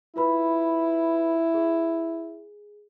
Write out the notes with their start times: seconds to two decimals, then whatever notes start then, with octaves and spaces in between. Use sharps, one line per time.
0.16 E4 F4 B4 B5
1.54 G#4